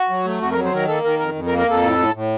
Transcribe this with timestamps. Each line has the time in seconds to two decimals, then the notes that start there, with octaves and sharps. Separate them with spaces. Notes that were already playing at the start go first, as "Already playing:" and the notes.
Already playing: F#4
0.09 F#3
0.25 A3
0.41 F2 F#4
0.52 A#4
0.57 F#3
0.65 C5
0.72 D#3 A#4
0.88 A#3 A4
1.04 D#3 A#4
1.19 F2 A#4
1.35 F2
1.47 A#4
1.52 A#3
1.59 A#4
1.68 F2 A4
1.83 A2
1.98 A2
2.14 A2